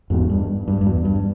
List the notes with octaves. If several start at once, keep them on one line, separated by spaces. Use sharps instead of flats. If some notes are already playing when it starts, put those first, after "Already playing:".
E2 G#2
G2
G2
G2
E2
G2